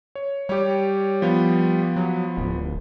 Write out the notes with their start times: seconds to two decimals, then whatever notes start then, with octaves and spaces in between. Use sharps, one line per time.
0.15 C#5
0.49 G3 G4 C#5
1.22 F3 B3
1.96 F#3
2.37 D1